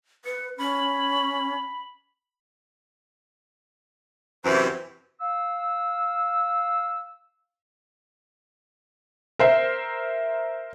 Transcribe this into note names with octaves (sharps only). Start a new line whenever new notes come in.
B4 C#7
C#4 B5
F#2 C3 E3 C5
F5 E6
A#4 C5 E5